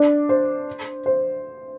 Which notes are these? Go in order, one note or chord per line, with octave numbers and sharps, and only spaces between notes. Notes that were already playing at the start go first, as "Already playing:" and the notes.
Already playing: D4 D5
C5
C5